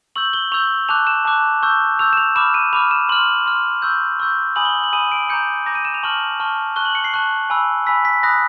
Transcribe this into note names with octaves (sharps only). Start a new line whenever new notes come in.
C#6 E6 G6 F#7
G7
C#6 E6 G6 F7
A5 D6 F#6 F7
E7
A5 D6 F#6
C#6 E6 G6
C#6 E6 G6 F7
E7
F7
B5 D6 F6 E7
D#7
B5 D6 F6 F7
E7
C6 F6 F#7
C6 F6
C#6 E6 G6
C#6 E6 G6
G#5 B5 D#6 F#7
G7
F#7
G#5 B5 D#6 D#7
D7
A#5 D6 G6 C#7
A#5 D6 G6 A#6
D#7
E7
F7
A5 C#6 F6 F#7
A5 C#6 F6
A5 C#6 F#6 G7
F#7
C#7
C7
A5 C#6 F#6
G#5 B5 E6
G#5 B5 E6 B6
B6
B5 D#6 F#6 A#6